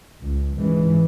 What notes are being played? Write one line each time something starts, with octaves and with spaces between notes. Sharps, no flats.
C#2
G#2 C#3 E3 G#3